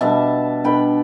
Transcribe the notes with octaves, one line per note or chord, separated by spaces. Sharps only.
B2 G3 D4 E5 A5
B2 B3 D4 G5 B5